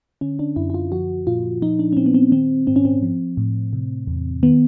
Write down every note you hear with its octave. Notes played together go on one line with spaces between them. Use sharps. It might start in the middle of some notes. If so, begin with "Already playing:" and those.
D3 C#4
D4
F#2 E4
E4
F4
F3 F#4
A#2 F4
F3 D#4
D4
C#4
A#2 C4
B3
C4
D#3 C4
G#2 C4
C#4
C4
F3
A2
C3
E2
D#3 B3